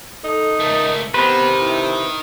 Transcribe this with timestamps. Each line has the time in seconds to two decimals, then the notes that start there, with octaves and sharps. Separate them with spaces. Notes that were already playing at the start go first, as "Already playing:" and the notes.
0.24 D#4 A4
0.60 C#2 A3 A#4
1.14 C3 D#3 B3 B4 C5
1.61 E4